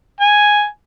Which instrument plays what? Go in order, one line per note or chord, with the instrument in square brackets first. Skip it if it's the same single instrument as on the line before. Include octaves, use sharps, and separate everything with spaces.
[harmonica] G#5